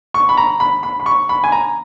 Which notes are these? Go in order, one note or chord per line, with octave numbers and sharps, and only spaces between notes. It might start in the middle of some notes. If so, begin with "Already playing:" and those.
C#6
B5
A#5
B5
B5
B5
C#6
B5
G#5
A#5